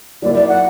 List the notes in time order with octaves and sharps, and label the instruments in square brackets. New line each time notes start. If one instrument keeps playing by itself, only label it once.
[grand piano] F#3 A#3 E4 [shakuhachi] D5
[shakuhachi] D5
F#5